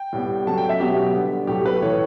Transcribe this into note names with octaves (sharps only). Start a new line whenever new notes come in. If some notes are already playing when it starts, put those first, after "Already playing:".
Already playing: G5
A2 G3 B3
C#3 F#3 A3 A5
G5
E5
B2 F#3 B3 G4
D3 G3 B3
A2 F#3 A3 G4
B4
A2 E3 A3 C#5